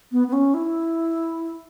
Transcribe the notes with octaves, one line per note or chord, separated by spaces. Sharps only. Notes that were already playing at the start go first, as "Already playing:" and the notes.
B3
B3
C#4
E4